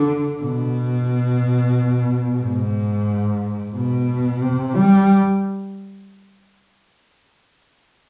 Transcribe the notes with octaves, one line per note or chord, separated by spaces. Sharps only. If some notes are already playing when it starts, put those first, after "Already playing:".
Already playing: D3
B2
G#2
B2
C3
G3